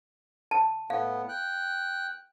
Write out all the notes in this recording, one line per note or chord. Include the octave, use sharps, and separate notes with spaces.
A5
A2 B3 F5
G5 F#6